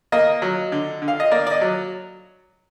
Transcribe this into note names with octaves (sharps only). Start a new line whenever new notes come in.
A#3 D#5
F#3
D3
D3
F5
D#5
A#3 D5
D5
D#5
F#3